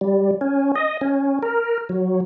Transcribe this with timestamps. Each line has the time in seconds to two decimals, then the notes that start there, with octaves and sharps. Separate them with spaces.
0.01 G3
0.41 C#4
0.76 D#5
1.01 C#4
1.42 A#4
1.89 F#3